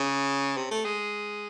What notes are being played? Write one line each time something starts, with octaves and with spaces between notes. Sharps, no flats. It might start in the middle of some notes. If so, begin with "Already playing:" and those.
Already playing: C#3
C3
A3
G#3